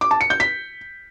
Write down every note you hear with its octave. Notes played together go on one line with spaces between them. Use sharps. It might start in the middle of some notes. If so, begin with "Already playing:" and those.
D6
A5
C#7
G6
B6